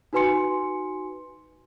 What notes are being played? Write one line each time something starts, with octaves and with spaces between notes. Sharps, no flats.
D#4 F#4 B4 G#5 C6 C#7